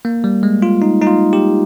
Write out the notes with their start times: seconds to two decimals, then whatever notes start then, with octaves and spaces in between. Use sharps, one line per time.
0.05 A#3
0.24 G3
0.43 G#3
0.62 F4
0.82 D#4
1.02 D#4
1.07 F4
1.33 G4